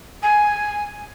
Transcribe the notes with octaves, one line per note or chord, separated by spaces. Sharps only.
G#5